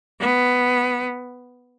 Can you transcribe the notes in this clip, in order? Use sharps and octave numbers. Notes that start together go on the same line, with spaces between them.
B3